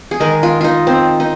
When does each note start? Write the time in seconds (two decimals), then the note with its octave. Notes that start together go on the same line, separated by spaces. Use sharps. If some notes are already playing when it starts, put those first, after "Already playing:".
0.11 G#4
0.20 D#3 G#3 A#4
0.43 F4
0.61 D#4 F4
0.87 C4
1.20 D#4